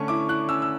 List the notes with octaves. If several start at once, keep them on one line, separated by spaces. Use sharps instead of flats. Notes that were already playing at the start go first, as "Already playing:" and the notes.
Already playing: D3 A3 C#4 C#6
E4 D6
E4 F#6
C#4 E6
E6